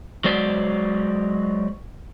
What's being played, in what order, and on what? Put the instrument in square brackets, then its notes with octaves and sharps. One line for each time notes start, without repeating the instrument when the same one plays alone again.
[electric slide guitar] F#3 G#3 C5 D5